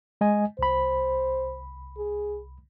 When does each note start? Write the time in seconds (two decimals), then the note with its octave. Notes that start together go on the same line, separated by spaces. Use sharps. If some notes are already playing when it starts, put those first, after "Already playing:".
0.21 G#3 D#5 G#5
0.59 C2 C5 B5
1.98 G#4